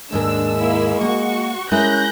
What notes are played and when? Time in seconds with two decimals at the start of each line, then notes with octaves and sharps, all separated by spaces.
0.12 D#2 G#2 G#3 D4 A#4 E6
0.59 A#3 E4 E6
1.01 A#3 F#4 F#5 C#6
1.71 G#3 C#4 E4 A#4 F#6 G6 A#6